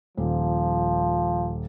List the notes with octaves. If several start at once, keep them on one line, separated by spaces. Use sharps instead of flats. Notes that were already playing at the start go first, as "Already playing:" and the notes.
D#1 F3